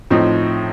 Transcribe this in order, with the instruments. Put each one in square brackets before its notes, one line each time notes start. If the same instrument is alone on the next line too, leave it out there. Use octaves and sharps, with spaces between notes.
[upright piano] A2 F3 C4 D#4